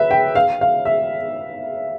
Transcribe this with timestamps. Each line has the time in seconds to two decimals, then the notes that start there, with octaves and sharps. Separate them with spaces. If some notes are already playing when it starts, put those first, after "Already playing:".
Already playing: B4 E5
0.11 G5
0.35 F5
0.61 F5
0.85 E5